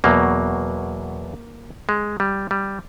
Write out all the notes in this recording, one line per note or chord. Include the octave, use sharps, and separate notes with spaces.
E2 B2 F#3 A#3
G#3
G3
G3